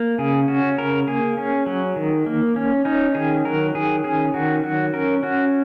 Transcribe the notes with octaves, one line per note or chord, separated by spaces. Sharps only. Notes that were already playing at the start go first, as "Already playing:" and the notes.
Already playing: A#3
C#3 G#4
C#4 F#4
C#3 A#4
A#3 G#4
C#4
F#3
D#3
A#3
C#4
C#4 D#4
D#3 G#4
F#3 A#4
D#3 G#4
C#4 G#4
D#3 F#4
F#3 F#4
C#4 A#4
C#4 F#4